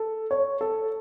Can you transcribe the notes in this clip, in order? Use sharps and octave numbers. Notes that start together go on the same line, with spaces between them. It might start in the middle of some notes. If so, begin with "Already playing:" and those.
Already playing: A4
C#5
A4